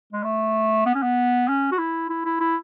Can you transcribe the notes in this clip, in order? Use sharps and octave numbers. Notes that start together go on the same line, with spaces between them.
G#3
A3
B3
C#4
B3
C#4
F#4
E4
E4
E4
E4